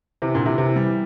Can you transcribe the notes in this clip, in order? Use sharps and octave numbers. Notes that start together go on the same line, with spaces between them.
C3 E3
A#2 D3
C3 E3
C3 E3
E3 G3